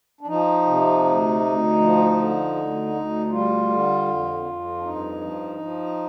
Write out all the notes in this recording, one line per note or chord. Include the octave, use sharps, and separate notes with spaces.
D4
F3 D#4
C3
D2
D2
F3
D3
D2
D2
D#4
G3 F4
D3
F2
F2
D4
G2 D#4
F3
F3